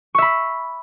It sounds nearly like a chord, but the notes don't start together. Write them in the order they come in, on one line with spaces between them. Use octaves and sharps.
C#6 E5 B5